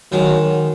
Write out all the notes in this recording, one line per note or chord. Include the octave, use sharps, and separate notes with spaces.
D#3 F#3 G#3